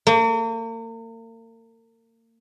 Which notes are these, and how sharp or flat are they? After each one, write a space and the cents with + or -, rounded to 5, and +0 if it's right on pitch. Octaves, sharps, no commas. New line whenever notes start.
A#3 -40